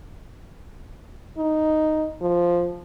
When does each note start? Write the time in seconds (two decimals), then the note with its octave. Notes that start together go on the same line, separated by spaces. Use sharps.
1.38 D#4
2.22 F3